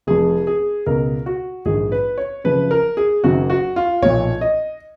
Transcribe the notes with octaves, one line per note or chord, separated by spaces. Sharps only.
F1 F2 F3 G#4
G#4
C#2 B2 A#4
F#4
A#1 G#2 D#3 G#4
B4
C#5
F#1 F#2 C#3 F3 B4
A#4
G#4
F#1 F#2 D#3 F#4
F#4
F4
B1 A#2 F3 C#5
D#5